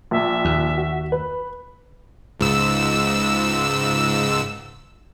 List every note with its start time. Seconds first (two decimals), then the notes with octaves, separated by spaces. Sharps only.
0.11 A#1 E5
0.45 D#2
0.78 F#4
1.12 B4
2.40 C#2 G#2 E6